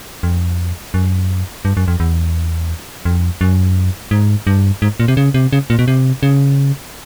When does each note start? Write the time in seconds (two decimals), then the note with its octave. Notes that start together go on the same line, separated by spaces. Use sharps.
0.23 F2
0.94 F#2
1.65 G2
1.77 F#2
1.88 F2
2.00 E2
3.05 F2
3.41 F#2
4.11 G#2
4.47 G2
4.82 G#2
5.00 A#2
5.08 C3
5.17 C#3
5.34 C3
5.53 C#3
5.70 A#2
5.79 B2
5.88 C3
6.23 C#3